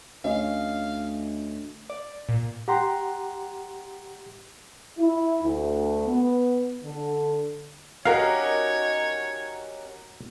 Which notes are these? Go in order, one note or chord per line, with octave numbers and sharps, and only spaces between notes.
D2 C#4 C#5 D#5 F5
D5
A#2
G4 F#5 A#5 C6
E4
D2
B3
D3
C#4 D#4 F#4 G4 A#4 C#5 F5